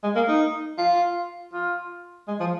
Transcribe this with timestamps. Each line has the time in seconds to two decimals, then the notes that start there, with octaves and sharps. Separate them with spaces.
0.03 G#3
0.16 A#3
0.28 D#4
0.78 F4
1.53 F4
2.28 G#3
2.40 F3